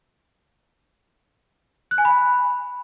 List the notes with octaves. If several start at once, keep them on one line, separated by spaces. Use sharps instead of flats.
F#6
G#5
B5